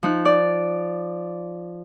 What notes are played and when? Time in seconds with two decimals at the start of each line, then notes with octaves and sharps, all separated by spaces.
0.03 F3 D#4 F#6
0.25 D5